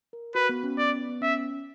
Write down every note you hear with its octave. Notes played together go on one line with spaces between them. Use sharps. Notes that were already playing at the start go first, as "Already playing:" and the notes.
A#4
F#4 B4
B3
C#4
B3 D5
B3
C#4 E5